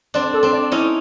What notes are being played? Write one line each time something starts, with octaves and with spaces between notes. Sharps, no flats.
C4 D4 D5
A4
C4 D4
D5
C#4 D#4 E4